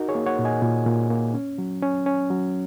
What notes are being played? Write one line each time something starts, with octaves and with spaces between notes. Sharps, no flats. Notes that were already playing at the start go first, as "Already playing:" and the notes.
Already playing: D#4 F#4 A#4
G#4 C#5
A#3
C#5 F#5
A#2
D#5 G#5
A#2
A#2
A#3
C#4
F#3
C#4
C#4
F#3